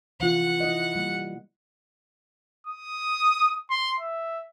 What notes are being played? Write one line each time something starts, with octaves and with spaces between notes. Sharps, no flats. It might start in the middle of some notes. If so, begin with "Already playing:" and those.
C3 E3 F4 F#5
E4 D#5
G3 A#3
D#6
C6
E5